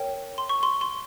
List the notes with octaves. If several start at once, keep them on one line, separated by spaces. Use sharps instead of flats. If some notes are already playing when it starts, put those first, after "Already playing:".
Already playing: A#4 C#5 G5
C6
C#6
C6
C6